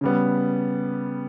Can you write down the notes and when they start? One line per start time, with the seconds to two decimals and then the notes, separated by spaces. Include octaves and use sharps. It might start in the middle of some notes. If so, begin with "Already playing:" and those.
0.01 C#3 G3 B3